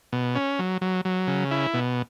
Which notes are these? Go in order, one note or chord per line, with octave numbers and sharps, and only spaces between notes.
B2
C#4
F#3
F#3
F#3
C#3
E4
B2